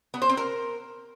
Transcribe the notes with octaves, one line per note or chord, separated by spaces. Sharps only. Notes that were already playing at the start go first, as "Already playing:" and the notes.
B3
C5
C4
A#4